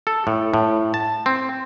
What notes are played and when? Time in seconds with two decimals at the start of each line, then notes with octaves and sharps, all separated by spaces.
0.07 A4
0.27 A2
0.54 A2
0.94 A5
1.26 C4